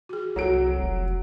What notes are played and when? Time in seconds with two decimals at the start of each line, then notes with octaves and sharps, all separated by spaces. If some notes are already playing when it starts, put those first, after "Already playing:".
0.09 F#4 G#4
0.36 C2 F#3 F#4 A4 D7
0.79 F1